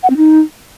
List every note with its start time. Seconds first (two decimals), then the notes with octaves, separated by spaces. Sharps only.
0.03 F#5
0.10 C4
0.17 D#4